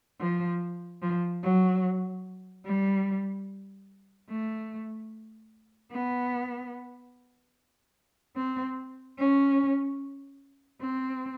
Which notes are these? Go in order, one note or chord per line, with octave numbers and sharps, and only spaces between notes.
F3
F3
F#3
G3
A3
B3
C4
C#4
C4